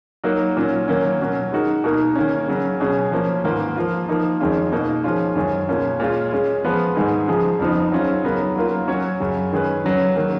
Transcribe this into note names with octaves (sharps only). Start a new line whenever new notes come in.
F#3 A#3 D#4 F#4
A#2 F#3 C#4
D#3 F#3 A#3 C#4
B2 F#3 C#4
G#3 D#4 F#4 A#4
B2 A#3 D#4 A#4
D#3 A#3 C#4
C#3 F#3 C#4
B2 F#3 C#4 G#4
F3 A#3 C#4
G#2 D#3 A#3 F4 B4
F3 A#3 F4
F3 A#3 D#4
F2 D#3 G#3 C#4 F4
B2 A#3 D#4
F3 G#3 C#4 F4
F#2 D#3 G#3 C#4 G#4
B2 A#3 C#4 F4
A#2 G#3 C#4 F4
G#3 C#4 G#4
F3 G#3 B3 F4 B4
G#2 D#3 G#3 D#4 G#4
C#3 F3 G#3 D#4 G#4
F2 C#3 F3 B3 D#4
F#3 C#4 F4
C#3 F#3 B3 D#4 A#4
F#3 A#3 F4 A#4
F#3 C#4 F#4 C#5
F#2 C#3 F#3
D#3 G#3 C#4 G#4 B4
C#3 F#3 C#4
D#3 F#3 A#3